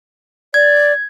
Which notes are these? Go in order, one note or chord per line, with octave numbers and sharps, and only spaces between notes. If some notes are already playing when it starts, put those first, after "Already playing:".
D5 G#6